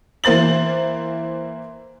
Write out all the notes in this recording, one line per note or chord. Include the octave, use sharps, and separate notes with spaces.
E3 A#3 C5 A6 F#7